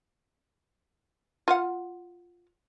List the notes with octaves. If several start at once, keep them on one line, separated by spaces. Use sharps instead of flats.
F4 F5 F#5